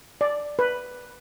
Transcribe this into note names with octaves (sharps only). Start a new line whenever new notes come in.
D5
B4